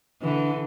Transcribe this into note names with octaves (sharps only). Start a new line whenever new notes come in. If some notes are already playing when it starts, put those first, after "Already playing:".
D3 E3